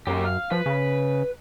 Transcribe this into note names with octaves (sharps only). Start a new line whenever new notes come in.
F#2 A#3 G4
F5
F3 B4
C#3